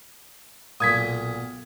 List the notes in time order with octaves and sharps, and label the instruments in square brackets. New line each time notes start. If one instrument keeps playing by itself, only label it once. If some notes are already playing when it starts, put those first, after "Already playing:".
[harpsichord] B1 A#2 [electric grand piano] D#6 G#6 B6